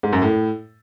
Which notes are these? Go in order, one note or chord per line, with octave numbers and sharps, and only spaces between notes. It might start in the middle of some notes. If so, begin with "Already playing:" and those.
G#2
F#2
A2